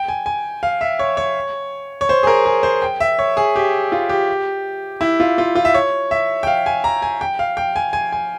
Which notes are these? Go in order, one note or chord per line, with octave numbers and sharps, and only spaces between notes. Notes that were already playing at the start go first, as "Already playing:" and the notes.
Already playing: G5
G#5
G#5
F5
E5
C#5
C#5
C#5
C5
G#4
A#4
G#4
C5
G5
E5
C#5
G#4
G4
F4
G4
E4
F4
F4
F4
E5
C#5
E5
G5
F5
G#5
A#5
G#5
G5
F5
G5
G#5
G#5
G#5